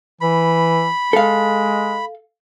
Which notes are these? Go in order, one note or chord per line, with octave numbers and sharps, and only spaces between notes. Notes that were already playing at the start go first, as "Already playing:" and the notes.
E3 B5
G#3 A4 F5